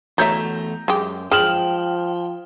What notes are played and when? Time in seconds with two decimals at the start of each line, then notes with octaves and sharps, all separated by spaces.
0.18 E2 F#3 A3 C#5 E5 A#5 G6
0.88 F#2 G#3 G4
1.32 F3 G#3 G5 F6 E7 F#7